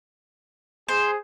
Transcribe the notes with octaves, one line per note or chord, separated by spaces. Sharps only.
G#4 C5